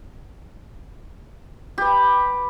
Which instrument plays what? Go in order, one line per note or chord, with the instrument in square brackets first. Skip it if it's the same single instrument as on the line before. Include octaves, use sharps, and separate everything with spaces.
[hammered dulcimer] G4 B4